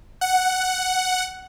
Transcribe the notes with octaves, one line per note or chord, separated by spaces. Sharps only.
F#5